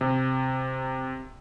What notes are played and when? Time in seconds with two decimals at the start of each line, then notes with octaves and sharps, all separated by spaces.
0.01 C3